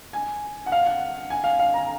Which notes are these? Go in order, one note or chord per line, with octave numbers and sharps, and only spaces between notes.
G#5
F#5
F5
F#5
G#5
F5
F5
A#5